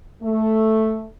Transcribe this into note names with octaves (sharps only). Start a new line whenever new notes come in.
A3